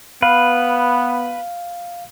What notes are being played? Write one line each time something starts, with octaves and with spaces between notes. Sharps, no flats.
B3 B4 F5